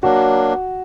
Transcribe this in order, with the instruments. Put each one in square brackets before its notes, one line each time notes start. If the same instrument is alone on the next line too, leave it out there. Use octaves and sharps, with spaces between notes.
[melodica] F#3 A#3 D4 [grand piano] F#4